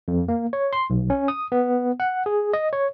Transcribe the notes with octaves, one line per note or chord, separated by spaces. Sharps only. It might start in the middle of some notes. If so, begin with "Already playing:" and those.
F2
A#3
C#5
C6
B1
C#4
D#6
B3
F#5
G#4
D#5
C#5